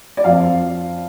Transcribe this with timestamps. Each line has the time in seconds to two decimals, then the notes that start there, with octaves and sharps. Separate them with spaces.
0.17 D5
0.24 F2 F3 C4 F5